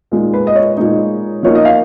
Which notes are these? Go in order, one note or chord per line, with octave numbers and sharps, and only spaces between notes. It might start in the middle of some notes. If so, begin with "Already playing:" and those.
A#2 G#3 D#4
B4
D#5
C#5
A#2 G#3 D#4
F3 A#3 D#4 C#5
D#5
F5